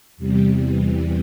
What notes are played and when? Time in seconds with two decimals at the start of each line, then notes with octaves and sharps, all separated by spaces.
0.17 E2 C3 G3
0.61 E2 C3 E3 G3